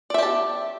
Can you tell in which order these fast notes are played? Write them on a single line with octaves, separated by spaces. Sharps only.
D5 E5 G4 A5